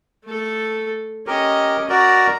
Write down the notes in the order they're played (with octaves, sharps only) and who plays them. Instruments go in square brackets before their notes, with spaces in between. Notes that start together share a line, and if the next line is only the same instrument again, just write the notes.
[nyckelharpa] A3 A4
[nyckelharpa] C#4 D#5 [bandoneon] G4 A#4
[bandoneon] F#4 A#4 D5 [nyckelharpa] A#5